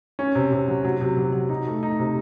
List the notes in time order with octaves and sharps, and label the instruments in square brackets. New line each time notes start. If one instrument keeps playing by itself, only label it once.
[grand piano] C#4
C3
C3
F#3
F#3
C3
F#3
F#3
D#4
A3
D#4
C3